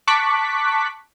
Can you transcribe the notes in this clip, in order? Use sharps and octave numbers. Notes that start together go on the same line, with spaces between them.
A5 C#6 D6 F#6 B6